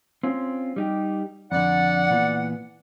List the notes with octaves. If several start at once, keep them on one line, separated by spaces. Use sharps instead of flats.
C4 C#4 F4
G3 D#4 G4
F2 D3 D5 F#5
A#2 E3 B3